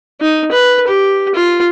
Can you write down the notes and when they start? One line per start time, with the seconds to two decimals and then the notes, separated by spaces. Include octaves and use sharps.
0.21 D#4
0.52 B4
0.87 G4
1.35 F4